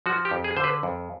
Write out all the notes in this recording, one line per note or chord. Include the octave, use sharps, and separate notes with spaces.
F3 F#4
G4
F2
G#4
D3 C5
B4
F2